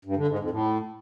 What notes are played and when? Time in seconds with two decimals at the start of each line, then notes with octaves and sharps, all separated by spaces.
0.05 G2
0.16 D3
0.28 G#2
0.39 F2
0.50 A2